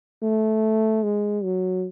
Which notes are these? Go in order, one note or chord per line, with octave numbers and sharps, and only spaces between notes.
A3
G#3
F#3